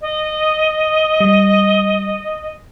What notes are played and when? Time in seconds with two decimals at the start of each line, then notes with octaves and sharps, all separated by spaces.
0.01 D#5
1.20 G3